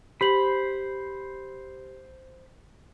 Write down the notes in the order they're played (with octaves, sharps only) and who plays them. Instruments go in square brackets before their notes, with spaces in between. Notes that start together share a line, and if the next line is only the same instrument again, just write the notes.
[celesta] G4 F#7 [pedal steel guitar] C5 B5